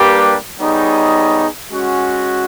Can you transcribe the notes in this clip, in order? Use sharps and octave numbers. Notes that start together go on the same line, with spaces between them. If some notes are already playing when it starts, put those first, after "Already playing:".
Already playing: G3 A#3 D4 G4 B4
G3 B3 D#4 G#4 C#5
G#3 C#4 F#4